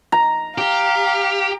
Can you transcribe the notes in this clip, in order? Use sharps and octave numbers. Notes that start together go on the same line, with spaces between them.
A#5
G4 F5